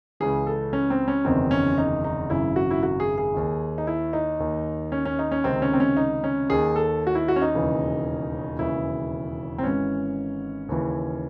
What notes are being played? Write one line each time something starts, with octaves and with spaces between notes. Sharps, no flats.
C#2 C#3 E3 G#4
A4
C#4
C4
C#4
F#1 E2 C3 D#3 C4
C#4
D#4
D#4
G#1 F#2 C#3 E4
F#4
E4
F#4
G#4
G#4
D#2 D#3
D#4
E4
D#4
D#2 D#3
C#4
C#4
D#4
C#4
C#2 C3 D#3 C4
C#4
C4
C#4
D#4
C#4
D#2 D#3 G#4
A4
F#4
E4
F#4
C#4
D#4
E1 D#2 C#3 E3
E1 D#2 C#3 E3 E4
C4
G#1 G#2 E3 C#4
D#2 C#3 E3